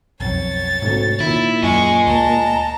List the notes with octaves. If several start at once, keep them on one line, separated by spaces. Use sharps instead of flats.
B1 F2 C#5 A6
D2 G#2 C3
A#2 D#3 E4
F#2 D#5 G#5 C#6
D2 A5 A#5